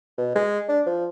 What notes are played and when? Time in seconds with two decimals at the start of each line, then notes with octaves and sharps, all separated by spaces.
0.18 B2
0.35 G#3
0.68 D4
0.86 F3